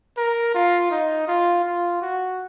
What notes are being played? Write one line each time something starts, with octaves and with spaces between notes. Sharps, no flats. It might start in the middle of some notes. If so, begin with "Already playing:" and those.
A#4
F4
D#4
F4
F4
F#4